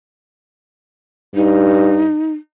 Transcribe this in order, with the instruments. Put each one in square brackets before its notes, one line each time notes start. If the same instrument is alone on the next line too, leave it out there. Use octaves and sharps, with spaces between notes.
[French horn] G2 [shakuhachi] D#4